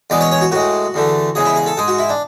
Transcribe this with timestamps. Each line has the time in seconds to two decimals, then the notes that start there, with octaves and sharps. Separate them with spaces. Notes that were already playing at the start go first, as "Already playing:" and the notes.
0.10 E2 B2 G#3 D5
0.21 C#5
0.31 C#5
0.41 F#4
0.51 A2 G#3 F#4
0.94 E2 D3 A3
1.35 E2 C#3 G#3 G#4
1.45 E4
1.56 G#4
1.66 A4
1.77 G#2 G#3 G#4
1.88 F#4
1.98 E4
2.09 D4